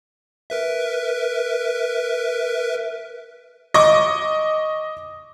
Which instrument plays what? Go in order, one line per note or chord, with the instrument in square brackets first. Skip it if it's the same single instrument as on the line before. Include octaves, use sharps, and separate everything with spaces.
[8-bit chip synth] A#4 B4 E5
[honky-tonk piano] D#5 C#6 D6